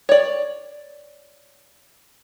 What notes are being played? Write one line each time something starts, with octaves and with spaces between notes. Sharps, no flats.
C#5 D5